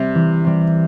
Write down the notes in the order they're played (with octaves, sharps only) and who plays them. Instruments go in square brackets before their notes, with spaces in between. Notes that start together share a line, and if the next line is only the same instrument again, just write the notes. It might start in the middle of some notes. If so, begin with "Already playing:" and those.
Already playing: [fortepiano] C3 [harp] G3 C4
[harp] E3
G3 C4